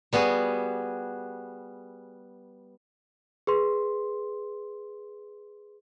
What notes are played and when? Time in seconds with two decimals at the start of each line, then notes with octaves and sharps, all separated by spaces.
0.13 G3 B3 F#4 G#4
3.47 G#4 B4 C6